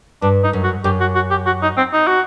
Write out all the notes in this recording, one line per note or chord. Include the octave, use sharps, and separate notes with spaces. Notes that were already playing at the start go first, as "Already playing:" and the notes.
G2 D4
D#4
F#2
F#4
F#2 G4
F#4
F#4
G4
F#4
D#4
C4
D#4
F#4